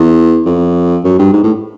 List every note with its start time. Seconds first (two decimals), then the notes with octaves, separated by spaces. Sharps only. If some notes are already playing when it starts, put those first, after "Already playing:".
Already playing: E2
0.46 F2
1.04 F#2
1.19 G2
1.33 G#2
1.43 A2